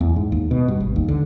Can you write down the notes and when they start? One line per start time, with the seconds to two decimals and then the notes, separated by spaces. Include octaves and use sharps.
0.01 E2
0.16 G#2
0.32 D#2
0.51 B2
0.68 G2
0.80 G#1
0.96 D#2
1.08 D3